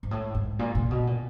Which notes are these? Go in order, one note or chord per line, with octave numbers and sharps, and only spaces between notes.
G#2
A2
G#2
A#2
A#2
B2
A#2